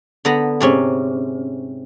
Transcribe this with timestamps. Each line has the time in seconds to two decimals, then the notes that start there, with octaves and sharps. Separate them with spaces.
0.25 D3 B3 A#5
0.60 G#2 C3 C#4